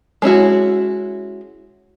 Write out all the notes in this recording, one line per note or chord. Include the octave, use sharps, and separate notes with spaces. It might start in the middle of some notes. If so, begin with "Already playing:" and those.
G#3 C#4 E4 F#4